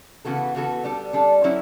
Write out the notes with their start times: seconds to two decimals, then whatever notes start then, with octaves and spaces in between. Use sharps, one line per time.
0.25 C#3 E3 B3 F#4 A4
0.55 C#3 E3 B3 F#4 A4
0.84 G3 D4 A4
1.13 G3 D4 A4
1.44 F#3 C#4 E4